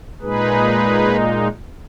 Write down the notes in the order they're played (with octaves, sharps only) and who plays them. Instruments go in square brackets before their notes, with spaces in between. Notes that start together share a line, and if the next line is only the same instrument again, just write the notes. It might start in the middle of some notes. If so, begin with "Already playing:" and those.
[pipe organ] A#2 G#3 D#4 G#4 B4